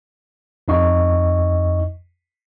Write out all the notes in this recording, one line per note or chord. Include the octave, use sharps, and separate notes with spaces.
F2 D#4 D#5 C#6